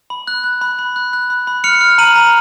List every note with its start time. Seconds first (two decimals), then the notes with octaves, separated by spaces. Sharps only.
0.10 B5
0.28 F#6
0.44 F#6
0.61 B5
0.79 B5
0.96 F#6
1.13 F#6
1.30 B5
1.47 B5
1.64 F6 C#7 F7
1.81 F6
1.98 A#5 D#7 F#7
2.15 A#5